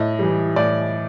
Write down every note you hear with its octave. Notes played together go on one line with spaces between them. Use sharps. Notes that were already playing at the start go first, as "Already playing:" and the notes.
Already playing: A2 D#5
E3 G3
A2 D5